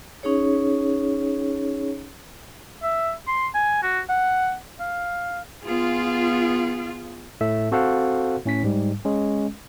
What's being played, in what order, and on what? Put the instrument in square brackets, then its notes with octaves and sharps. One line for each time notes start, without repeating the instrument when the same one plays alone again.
[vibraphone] C#4 D#4 G#4 C#5
[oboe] E5
C6
G#5
F#4
F#5
F5
[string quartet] B3 G#4 [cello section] F4
[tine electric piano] A2 A4 E5
C4 F#4 A4 C5 F5 F#5
A2 C#4 B6
G#2 G3
G#3 C#4